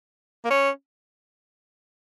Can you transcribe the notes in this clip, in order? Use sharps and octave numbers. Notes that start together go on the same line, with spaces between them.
A#3
C#4